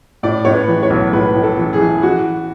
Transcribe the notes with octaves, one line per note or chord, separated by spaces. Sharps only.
A2 D5
A2 C#5
B4
E3
C#5
B1
A2 B4
A2
A4
E3
G#4
E3
E3 F#4